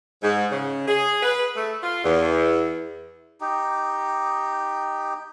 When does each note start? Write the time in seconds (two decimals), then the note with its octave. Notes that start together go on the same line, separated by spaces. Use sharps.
0.23 G#2
0.52 C#3
0.88 G#4
1.23 B4
1.57 A3
1.83 F4
2.04 E2
3.41 D#4 G4